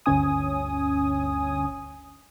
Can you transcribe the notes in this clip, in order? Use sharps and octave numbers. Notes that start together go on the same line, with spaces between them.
G1 D2 C#4 G#5 D#6